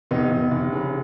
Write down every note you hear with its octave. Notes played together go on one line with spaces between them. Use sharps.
F1 B3 D#4
F1
F1
C#3